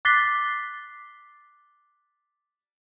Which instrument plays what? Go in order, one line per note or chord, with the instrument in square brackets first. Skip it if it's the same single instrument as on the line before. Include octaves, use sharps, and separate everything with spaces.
[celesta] D6 F#6 A6 B6 C7 G7